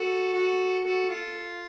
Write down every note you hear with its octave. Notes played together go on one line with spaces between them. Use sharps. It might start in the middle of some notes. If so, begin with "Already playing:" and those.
Already playing: F#4 A4
F#4
F#4 A4
F4